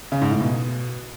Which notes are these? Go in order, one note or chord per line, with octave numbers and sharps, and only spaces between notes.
C#3
G#2
A2
B2